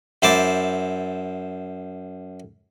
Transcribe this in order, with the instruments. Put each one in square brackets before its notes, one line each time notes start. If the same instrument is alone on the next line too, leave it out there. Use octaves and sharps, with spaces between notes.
[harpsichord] F#2 E4 C5 A5 D6